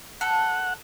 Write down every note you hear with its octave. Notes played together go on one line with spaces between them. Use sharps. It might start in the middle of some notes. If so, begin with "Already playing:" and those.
A4 F#5